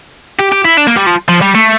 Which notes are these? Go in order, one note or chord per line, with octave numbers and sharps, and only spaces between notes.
G4
G4
E4
D4
A#3
G3
F3
F3
G3
A3